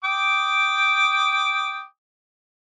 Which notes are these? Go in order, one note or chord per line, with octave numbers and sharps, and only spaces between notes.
G5 D6 D#6